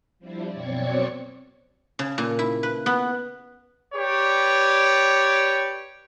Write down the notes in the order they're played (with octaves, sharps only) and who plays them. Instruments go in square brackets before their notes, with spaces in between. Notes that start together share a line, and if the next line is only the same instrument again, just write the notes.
[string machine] F3 G3 C4 D4 E4
F#2 B2 C4 C#5 D5 C#6
[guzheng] C#3
A#2
E4
B4
B3
[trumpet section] G4 B4 C#5 D5